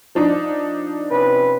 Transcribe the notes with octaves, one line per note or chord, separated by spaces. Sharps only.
F3 D4 D#4
C3 C#4 B4